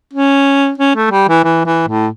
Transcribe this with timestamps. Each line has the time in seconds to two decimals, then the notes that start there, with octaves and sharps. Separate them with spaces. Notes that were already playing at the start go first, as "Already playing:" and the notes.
0.13 C#4
0.78 C#4
0.96 A3
1.11 G3
1.29 E3
1.44 E3
1.66 E3
1.88 A2